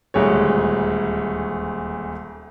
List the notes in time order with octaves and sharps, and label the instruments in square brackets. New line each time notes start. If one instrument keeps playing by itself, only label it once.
[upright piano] D#1 D2 G#3 C#5